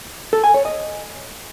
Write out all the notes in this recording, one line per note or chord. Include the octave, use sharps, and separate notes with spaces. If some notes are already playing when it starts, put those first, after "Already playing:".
A4
G#5
C#5
D#5